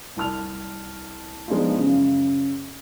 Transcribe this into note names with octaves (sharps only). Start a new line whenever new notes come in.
C2 A5 F6 F7
F3 G#3 B3 D4 D#4 F4
F#2 C#3